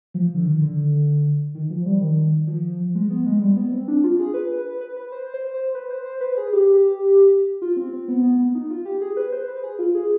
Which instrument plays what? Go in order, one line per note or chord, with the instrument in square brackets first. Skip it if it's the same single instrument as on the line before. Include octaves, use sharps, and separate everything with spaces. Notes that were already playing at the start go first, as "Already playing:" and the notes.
[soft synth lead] F3
D3
D#3
D3
D#3
F3
G3
D#3
F3
G#3
B3
G#3
G3
B3
C4
D4
F4
G#4
B4
B4
B4
B4
C5
C5
C5
B4
C5
C5
B4
G#4
G4
F4
C4
C4
B3
B3
B3
D#4
F4
G4
G#4
B4
C5
B4
G#4
F4
G#4